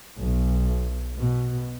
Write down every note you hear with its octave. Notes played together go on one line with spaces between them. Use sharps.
B1
B2